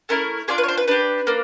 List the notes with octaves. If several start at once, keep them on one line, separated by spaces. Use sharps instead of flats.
A3 C#4 E4 A#4
D4 F4 G#4 D5
B4
C#5
C5
B4
D4 G4 B4
A#3 D4